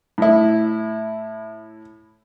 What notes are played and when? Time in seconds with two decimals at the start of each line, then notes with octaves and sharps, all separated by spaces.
0.18 A2 E4